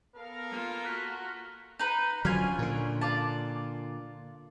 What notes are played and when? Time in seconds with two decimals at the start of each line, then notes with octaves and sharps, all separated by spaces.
0.17 B3 A4 A#4 F5
0.50 A#3 F4
0.84 F#4 A#5 F6 F#6 B6
1.79 D#4 B4 A#5
2.25 D3 F3 F#3 C#4 F4 G#5
2.59 A#2 D3
3.01 F4 D5 A5